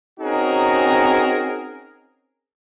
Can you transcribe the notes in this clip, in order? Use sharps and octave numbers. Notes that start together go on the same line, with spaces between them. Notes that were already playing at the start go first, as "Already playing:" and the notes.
C4 C#4 D#4 F#4 G#4 A#4